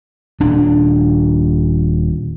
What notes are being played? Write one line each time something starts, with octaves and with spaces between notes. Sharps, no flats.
D#1 D4